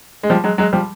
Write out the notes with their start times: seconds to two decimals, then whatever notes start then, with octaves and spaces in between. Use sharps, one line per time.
0.23 G#3
0.30 F3 G3
0.44 F#3 G#3
0.58 F#3 G#3
0.73 F3 G3